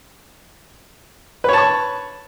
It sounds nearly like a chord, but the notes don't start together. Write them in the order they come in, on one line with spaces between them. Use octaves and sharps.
B4 C#5 A5 C#6